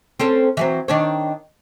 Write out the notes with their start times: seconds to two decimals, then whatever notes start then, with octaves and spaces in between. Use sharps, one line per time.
0.19 C4 C#4 A4
0.57 E3 F#3 C4
0.88 D#3 D4 C#5